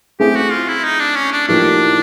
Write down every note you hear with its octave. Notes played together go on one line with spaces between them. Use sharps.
A3 C4 E4 G4 G#4
F#4
F4
E4
D#4
D4
C#4
D4
A2 F3 A#3 D4 D#4 G4